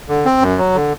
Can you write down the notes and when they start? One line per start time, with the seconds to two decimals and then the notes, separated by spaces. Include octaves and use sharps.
0.08 D3
0.25 C4
0.41 F#2
0.58 F#3
0.75 D3